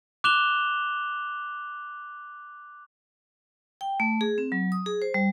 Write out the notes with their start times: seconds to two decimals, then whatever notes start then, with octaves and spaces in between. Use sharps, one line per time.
0.24 D6 F#6 E7 F7 G7
3.81 G5
4.00 A3
4.21 G#4
4.38 C4
4.52 F#3
4.72 D#6
4.86 G#4
5.02 C5
5.14 G3